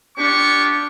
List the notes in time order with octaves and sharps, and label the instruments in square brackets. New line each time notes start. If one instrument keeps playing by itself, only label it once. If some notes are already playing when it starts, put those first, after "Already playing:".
[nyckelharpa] D4 [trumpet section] F4 G4 C#6